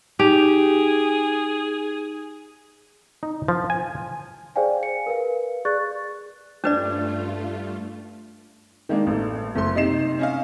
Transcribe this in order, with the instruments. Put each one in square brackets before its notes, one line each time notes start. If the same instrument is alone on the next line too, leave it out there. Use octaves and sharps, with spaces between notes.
[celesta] D#4 D7 F7 [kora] G4 [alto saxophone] G#4
[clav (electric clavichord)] D#4
F3
G#5
[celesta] G#4 C5 D5 F5 G5 G#5
C#7
A#4 B4 F5
G#4 D5 C#6 F#6 A6
[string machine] G2 A3 F4 [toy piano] C#4 B4 D5 [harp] D4
[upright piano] D#3 G#3 A#3 D4
A1 A4
F#1 A3 C6
C3 D#4 D#5 C7 E7
C#4 D#5 F5